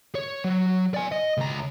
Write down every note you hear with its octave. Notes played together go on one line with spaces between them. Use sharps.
C#5
F#3
D5 G#5
D#5
C#2 A#5